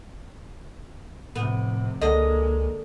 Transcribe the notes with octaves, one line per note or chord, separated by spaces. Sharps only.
F1 A2 C3 B3
C#2 D3 G#3 A#3 D#5